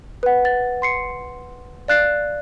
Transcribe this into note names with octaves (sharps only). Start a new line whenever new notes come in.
B4 F#5
A6
C6 C7 C#7
D5 F5 F#6 A6 C7